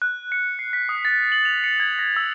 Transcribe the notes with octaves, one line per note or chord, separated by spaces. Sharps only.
F#6
C#7
C7
B6
D#6
A6
F#7
F7
C#7
G#6
A#6
E6